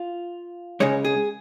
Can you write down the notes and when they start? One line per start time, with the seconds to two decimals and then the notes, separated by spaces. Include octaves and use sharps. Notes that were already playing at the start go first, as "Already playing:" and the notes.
Already playing: F4
0.80 C#2 C#3 G#3 C#5
1.05 G#4